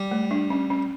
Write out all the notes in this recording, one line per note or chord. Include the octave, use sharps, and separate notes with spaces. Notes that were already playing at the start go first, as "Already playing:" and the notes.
Already playing: G3
A3
D4
C#4
C#4